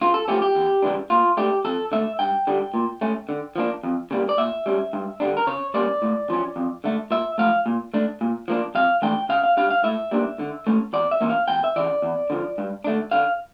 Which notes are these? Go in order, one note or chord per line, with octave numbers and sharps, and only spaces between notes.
C#3 F4
A4
F3 A3 C#4 G4
G4
E2
C#3 E3 G3 D4
A#2 F4
A3 D4 G4
F2 A4
D3 A3 E5
G2 G5
D3 G3 D4
A#2
A3 C#4
D3
F3 A#3 D4
F2
C#3 G3 A#3
D5
A#2 E5
G3 C#4
G2
D3 G3 D4
A#4
C#3 C#5
G3 A#3 C#4 D5
A2
F3 C#4
F2
D3 A3
A#2 E5
F3 A3 F5
A#2
A3 D4
A#2
F3 A#3 D4
F2 F5
E3 A3 D4 G5
C#3 F5
F5
G3 D4 F5
F5
A2 E5
G3 A#3 D4
D3
A3 C#4
E2 D5
E5
E3 A#3 C#4
F5
E2 G5
E5
C#3 E3 D5
E2
D3 F3
G2
D3 A3 D4
D3 F5